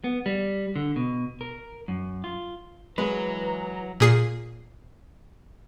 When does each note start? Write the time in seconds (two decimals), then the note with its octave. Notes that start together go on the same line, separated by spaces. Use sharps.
0.04 B3
0.26 G3
0.76 D3
0.96 B2
1.41 A#4
1.88 F#2
2.24 F4
2.98 E3 F#3 G#3 B4 A#5
4.00 A#2 G#4 C7